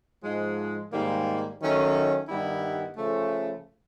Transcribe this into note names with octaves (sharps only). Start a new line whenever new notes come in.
G#2 F3 G#3
G#2 D#3 G3 A#3
D#3 F#3 A3 C#4
G2 D#3 G3 B3 E4
C#3 F3 A3